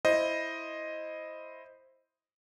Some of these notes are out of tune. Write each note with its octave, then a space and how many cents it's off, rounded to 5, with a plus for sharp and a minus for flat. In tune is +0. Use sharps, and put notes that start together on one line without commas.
E4 +0 C5 +5 D#5 +0